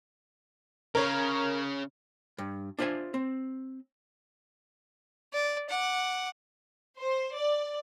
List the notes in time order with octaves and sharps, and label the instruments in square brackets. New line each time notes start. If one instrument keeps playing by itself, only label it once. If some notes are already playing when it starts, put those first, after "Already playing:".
[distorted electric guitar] C#3 [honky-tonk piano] A#4 C#5
[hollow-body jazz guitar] G2
D4 F4 C5 E5 G#5
C4
[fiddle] D5
F#5 D6
[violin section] C5
D5